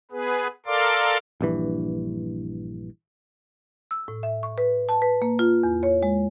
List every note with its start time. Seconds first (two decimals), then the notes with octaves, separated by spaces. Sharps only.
0.11 B3 G#4 B4
0.66 A4 A#4 D5 F5 C6 D6
1.41 A#1 G2 E3
3.91 E6
4.08 A2
4.23 E5
4.43 C#6
4.58 B4
4.89 A5
5.02 B4
5.22 A#3
5.39 F4
5.63 E2
5.83 C#5
6.03 G#3